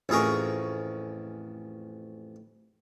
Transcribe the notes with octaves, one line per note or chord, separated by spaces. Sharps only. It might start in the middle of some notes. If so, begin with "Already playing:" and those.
A1 F2 G#4 A#4 C#6